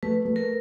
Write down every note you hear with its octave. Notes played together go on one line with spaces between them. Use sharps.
A3 B4
A3
A#4